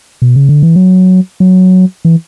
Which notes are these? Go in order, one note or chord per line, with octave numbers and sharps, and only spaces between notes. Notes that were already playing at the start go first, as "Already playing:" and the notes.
B2
C#3
D3
E3
F#3
F#3
E3